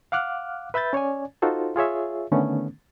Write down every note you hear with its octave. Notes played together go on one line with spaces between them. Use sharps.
F5 F#5 D6 F6 F#6
B4 E5 B5 G6 A6
C#4 C#5 D5 G#5
D#4 F4 F#4 A4 C5
F4 G#4 C#5 E5
D3 D#3 A3 B3 C#4